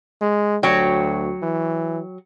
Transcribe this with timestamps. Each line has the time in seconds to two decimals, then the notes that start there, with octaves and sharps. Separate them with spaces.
0.22 G#3
0.63 D2 F#3 C#5 G5
1.43 E3